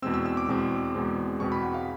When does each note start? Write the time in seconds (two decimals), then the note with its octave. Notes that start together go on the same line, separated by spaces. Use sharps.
0.02 E2 B2 G#3 C4 E6
0.14 E6
0.26 E6
0.37 D6
0.48 E2 B2 G#3 C4
0.95 E2 B2 G#3 C4
1.40 E2 B2 G#3 C4 C#6
1.52 B5
1.63 F#5
1.74 F5